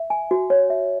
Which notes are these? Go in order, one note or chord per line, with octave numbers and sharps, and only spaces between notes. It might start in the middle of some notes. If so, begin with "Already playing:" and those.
Already playing: E5
G#5
F#4
C#5
E5